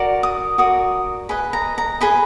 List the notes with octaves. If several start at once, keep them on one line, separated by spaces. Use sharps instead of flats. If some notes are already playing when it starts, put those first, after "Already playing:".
Already playing: F#4 A#4 D5
D#6
F#4 A#4 D5 D#6
G#4 B4 D#5 B5
A#5
A#5
G#4 B4 D#5 B5